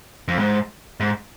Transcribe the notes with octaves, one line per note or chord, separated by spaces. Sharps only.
F2
G#2
G#2